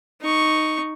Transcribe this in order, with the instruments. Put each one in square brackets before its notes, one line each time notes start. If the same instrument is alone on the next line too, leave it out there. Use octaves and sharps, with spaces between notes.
[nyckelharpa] D#4 C#6